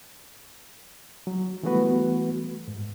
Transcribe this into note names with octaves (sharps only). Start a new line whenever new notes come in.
F#3
E3 G3 A3 B3 F#4 B4
G#2